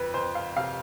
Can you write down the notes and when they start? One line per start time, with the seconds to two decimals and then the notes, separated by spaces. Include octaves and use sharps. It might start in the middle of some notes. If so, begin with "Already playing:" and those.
Already playing: F2 B4
0.14 F2 C5
0.35 F5
0.57 C3 F5